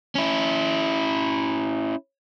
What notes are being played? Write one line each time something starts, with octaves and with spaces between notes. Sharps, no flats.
C#4 E4